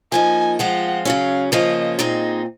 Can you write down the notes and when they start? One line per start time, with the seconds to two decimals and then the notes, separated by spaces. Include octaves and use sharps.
0.12 F3 A#3 D#4 G#5
0.59 F3 G#3 C4 F4 F#5
1.05 C#3 F#3 C#4 F5
1.52 C#3 F3 A#3 C#4 F4 D#5
1.99 A#2 G#3 C4 D#4